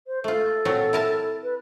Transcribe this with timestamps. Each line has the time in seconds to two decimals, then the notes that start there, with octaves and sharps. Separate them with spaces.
0.07 C5
0.24 A3 F4 A4
0.65 A#2 F#3 C4
0.93 E4 A#4 A5
1.43 B4